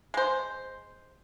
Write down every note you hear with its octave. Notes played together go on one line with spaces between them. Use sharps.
G#3 C5